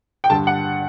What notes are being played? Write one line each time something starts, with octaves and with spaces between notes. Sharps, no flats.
G5
G2 D3 A5
F#5